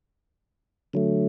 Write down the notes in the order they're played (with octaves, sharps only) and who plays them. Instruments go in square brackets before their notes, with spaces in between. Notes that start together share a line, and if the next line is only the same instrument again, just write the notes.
[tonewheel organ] D3 F#3 A3